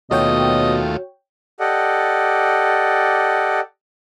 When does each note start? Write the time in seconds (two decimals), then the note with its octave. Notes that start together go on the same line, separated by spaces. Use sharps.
0.11 D#2 B2 A3 F4 F#4 C#5 D#5 G5
1.60 G4 A4 D5 D#5 F#5